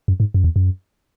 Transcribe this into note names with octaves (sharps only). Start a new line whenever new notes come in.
F#2
G#2
F#2
E2
F#2